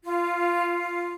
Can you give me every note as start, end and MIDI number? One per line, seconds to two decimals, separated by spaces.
0.04 1.13 65